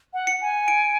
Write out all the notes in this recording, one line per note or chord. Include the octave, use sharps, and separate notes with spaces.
F#5
C#7
G#5
D7